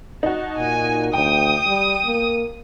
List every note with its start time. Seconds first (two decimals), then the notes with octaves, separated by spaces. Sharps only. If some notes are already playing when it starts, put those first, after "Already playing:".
0.23 D#4 F#4 A5
0.57 A#2 G#5
1.13 D2 G5 D#6
1.67 G3
2.05 A#3